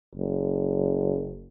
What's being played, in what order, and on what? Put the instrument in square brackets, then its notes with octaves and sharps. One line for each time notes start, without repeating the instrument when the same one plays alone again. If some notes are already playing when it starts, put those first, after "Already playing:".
[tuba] F#1